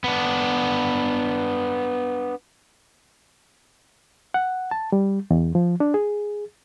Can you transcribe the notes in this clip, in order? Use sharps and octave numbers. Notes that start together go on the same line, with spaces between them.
B3 D4
F#5
A5
G3
E2
F3
D4
G#4